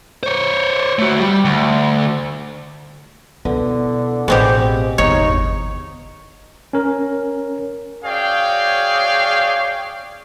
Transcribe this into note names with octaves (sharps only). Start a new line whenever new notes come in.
C5 C#5
A3 F#4
G3
D2
B2 D3 B3 E4
A1 B2 C4 G4 G#4 D#5 F5
G1 E2 D#4 C#5
C#4 A#4
F#4 G#4 C#5 D5 F5 G5